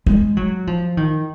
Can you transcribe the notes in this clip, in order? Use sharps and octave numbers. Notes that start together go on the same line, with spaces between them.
G#3
F#3
F3
D#3